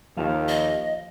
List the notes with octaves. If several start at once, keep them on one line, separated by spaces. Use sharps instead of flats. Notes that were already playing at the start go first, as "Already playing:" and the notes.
D#2 F3 F5 A5
D#5